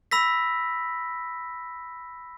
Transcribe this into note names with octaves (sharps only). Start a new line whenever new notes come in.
B5 E6 A#6 B6